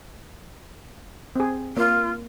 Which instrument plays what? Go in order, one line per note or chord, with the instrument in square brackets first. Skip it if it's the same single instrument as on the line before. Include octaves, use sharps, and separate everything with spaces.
[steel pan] C4 G#4
[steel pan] A#3 [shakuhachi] F4